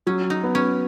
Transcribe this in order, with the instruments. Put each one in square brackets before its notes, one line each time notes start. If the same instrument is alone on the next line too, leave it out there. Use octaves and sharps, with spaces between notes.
[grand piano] F#3 [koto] C#4
[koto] D#4
[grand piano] B3
[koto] C#4